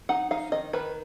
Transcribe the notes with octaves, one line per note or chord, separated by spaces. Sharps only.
D#4 F#5
D#4 F5
D#3 D#5
D#3 B4